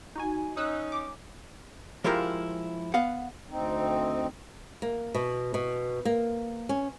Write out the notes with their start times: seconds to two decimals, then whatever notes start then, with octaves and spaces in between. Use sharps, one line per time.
0.16 D#4 F#4 G#5
0.57 C#4 D#4 D#6 E6 F#6
0.92 D6
2.04 F3 G#3 E4 F4 G4 A#4
2.94 B3 F5 F#5
3.50 D2 C4 D#4
4.82 A#3
5.14 B2
5.54 B2
6.05 A#3
6.69 C#4